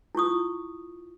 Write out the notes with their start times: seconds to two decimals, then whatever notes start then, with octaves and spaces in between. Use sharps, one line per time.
0.15 E4 F4 C#6 D#6